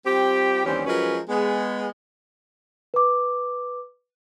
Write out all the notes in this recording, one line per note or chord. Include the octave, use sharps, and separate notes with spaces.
G3 C4 F4 G4
D#2 E3 G3 C4 C#4 G4
F3 F#3 G#3 C#4 A#4 B4
G#3 B3
B4 D6